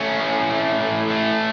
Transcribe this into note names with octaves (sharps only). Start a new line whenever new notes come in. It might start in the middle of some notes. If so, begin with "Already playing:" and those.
Already playing: A3 C#4
A2
A3
A2
A3